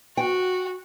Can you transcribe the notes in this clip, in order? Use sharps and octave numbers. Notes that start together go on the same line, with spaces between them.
F#4 G5